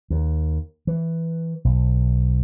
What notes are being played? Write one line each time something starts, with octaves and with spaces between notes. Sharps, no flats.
D#2
E3
B1